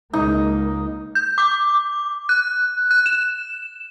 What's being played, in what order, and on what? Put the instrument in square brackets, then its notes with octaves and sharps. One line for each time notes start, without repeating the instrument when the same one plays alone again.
[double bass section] C#2 G#3 A#3 [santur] D#4
[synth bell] G6
D6
F#6
F#6
E7